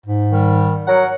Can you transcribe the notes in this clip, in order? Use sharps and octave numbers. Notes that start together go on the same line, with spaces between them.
G#2
D#3 G3
F#3 A#4 F#5